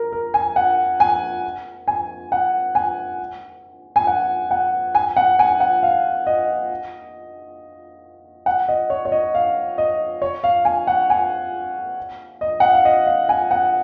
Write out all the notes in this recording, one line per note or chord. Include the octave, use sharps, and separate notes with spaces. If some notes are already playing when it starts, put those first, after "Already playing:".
Already playing: A#4
A#4
G#5
F#5
G#5
G#5
F#5
G#5
G#5
F#5
F#5
G#5
F#5
G#5
F#5
F5
D#5
F#5
D#5
C#5
C#5
D#5
F5
D#5
C#5
F5
G#5
F#5
G#5
D#5
F#5
F5
D#5
F5
G#5
F#5